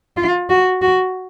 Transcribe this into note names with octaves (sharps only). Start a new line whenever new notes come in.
F4
F#4
F#4